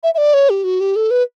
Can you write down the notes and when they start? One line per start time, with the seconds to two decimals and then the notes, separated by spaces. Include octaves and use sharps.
0.03 E5
0.14 E5
0.18 D5
0.34 C#5
0.50 G4
0.64 F#4
0.80 G4
0.96 A4
1.11 B4